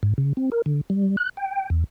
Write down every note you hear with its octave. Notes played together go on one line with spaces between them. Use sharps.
G#2
C#3
C4
A#4
D3
G3
F#6
G5
E2